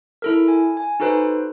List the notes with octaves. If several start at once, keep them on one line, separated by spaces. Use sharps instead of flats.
E4 A4 A#4
G#5
G#5
D#4 F#4 A4 B4 C5